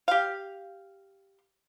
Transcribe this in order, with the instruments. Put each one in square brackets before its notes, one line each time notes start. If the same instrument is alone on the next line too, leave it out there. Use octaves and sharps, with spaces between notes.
[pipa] G4 F5